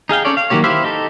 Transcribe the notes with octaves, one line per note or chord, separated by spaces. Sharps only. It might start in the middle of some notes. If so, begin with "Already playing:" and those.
D#4 G#4 F5 G5
C#4 A4 C#5 D5
F5
D#3 F#3 A#3 G4 C#5
E4 G4 C5 E5 F5
D#4 G4 A4